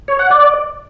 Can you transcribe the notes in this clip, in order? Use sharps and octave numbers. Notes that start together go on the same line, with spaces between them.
C#5
F#5
D5